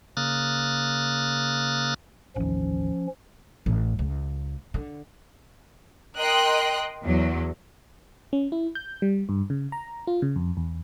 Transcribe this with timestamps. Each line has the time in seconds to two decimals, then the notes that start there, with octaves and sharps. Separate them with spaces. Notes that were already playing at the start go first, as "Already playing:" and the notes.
0.17 C#3 A#3 D#6 F6 F#6 A6
2.36 A1 D#2 F3 C#4
3.66 A1
3.99 C#2
4.74 D3
6.18 A#4 D#5 G5 C6 F#6
7.04 E2 F#3
8.33 C#4
8.52 E4
8.75 G6
9.02 G3
9.29 G2
9.50 C#3
9.72 A#5
10.07 F4
10.22 C#3
10.36 F2
10.57 E2